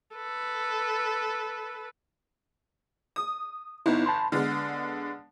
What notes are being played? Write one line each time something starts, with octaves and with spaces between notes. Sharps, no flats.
A4 B4
D#6
G1 B3 D#4 E4
A5 B5 C6
D3 G#3 B3 F6